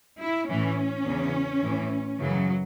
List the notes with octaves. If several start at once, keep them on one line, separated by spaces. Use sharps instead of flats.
E4
A2 E3 C#4
E2 C#3 E3
A2 E3
F#2 C#3 E3 F#3